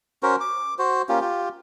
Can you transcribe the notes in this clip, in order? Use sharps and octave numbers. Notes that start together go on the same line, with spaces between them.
C#4 F#4 A#4 C5
D6
F#4 C5
A#3 C#4 F4 G4
F4 G4